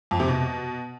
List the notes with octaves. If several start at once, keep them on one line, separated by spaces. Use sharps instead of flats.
F2
C3
B2